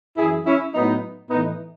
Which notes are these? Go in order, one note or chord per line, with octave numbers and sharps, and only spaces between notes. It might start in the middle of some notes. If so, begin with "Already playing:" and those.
F#2 E3 E4 G#4
C#4 E4
A2 F#3 B3 D#4
A2 E3 B3 D#4